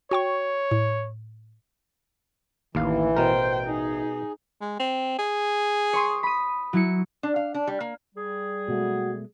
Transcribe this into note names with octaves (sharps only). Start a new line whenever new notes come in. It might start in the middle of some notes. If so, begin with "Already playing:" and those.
F#4 C#5 G5 C#6
A2
A1 D#2 E3 F5
B2 A#4 C5 G5
D#4 G#4
G#3
C4
G#4
C#5 C6 D#6
B5 D#6
F#3 E4 C#7
D4
F5
D4
G3
A#3
G3 G#4
B2 G#3 A3 F#4